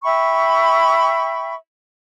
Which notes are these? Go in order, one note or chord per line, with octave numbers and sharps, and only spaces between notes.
E5 G5 B5 C#6